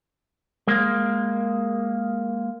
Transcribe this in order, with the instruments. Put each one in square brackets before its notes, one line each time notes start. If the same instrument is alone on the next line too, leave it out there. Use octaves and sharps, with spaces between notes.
[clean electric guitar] G#3 A#3